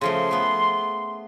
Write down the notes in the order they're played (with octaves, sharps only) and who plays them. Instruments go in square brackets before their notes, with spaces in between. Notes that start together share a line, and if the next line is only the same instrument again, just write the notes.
[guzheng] C#3 F3 A3 [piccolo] C6
[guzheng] A3 B3